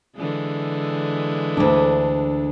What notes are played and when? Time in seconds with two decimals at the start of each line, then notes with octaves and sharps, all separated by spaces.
0.16 D3 E3 G#3
1.57 D2 D4